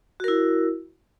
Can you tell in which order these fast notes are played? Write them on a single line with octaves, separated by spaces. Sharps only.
F#4 A#4 E4